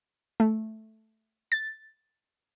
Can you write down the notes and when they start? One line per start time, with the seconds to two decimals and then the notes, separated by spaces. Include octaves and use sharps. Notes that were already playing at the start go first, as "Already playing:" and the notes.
0.40 A3
1.52 A6